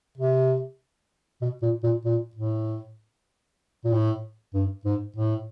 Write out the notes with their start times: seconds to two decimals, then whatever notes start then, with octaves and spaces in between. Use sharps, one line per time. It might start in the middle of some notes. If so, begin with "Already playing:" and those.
0.18 C3
1.42 B2
1.62 A#2
1.84 A#2
2.05 A#2
2.35 A2
3.85 A#2
3.92 A2
4.54 G2
4.85 G#2
5.16 A2